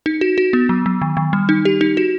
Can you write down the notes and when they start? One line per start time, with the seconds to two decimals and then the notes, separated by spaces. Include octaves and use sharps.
0.06 D#4
0.21 F#4
0.38 F#4
0.53 B3
0.69 F#3
0.86 F#3
1.02 D#3
1.17 D#3
1.33 G3
1.49 D#4
1.65 G4
1.81 D#4
1.97 F#4